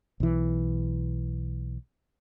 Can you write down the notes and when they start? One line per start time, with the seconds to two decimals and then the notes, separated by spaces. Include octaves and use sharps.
0.20 B1 E3